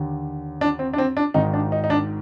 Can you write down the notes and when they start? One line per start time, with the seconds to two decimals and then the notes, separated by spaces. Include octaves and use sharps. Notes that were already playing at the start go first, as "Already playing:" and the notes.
Already playing: D#2 D3
0.61 D4
0.79 C4
0.93 D4
0.98 C4
1.17 D4
1.34 G#1 G#2 D#3 D#4
1.53 D4
1.72 D#4
1.84 D#4
1.90 D4